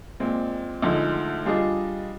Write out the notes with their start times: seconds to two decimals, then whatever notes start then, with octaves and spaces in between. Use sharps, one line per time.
0.20 A#2 G#3 C4
0.82 D2 D3 F3 G#3 D#4
1.45 G3 D4 F4 G#4 D#5